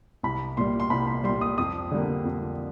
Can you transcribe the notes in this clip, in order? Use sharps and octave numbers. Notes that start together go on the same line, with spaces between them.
C2 B5
A#2 G3 C6
C6
C2 B5
B5
A#2 G3 C6
D#6
F2 D#6
D3 G3 A#3
F2